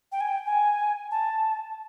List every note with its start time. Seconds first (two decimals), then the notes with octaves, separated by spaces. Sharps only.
0.12 G5
0.21 G#5
0.28 G5
0.46 G#5
1.11 A5